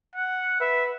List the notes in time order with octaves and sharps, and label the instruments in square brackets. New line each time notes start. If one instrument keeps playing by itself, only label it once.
[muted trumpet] F#5
[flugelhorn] B4 [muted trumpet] E5